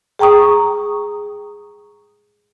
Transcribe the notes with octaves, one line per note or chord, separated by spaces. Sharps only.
G#4 G5 A#5 C#6 D#6